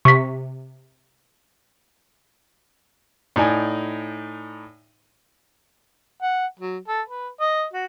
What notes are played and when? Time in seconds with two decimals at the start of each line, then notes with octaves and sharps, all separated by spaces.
0.05 C3 C#6 B6
3.36 A2 D#4 D5 G#5
6.22 F#5
6.60 F#3
6.88 A4
7.08 B4
7.40 D#5
7.73 F#4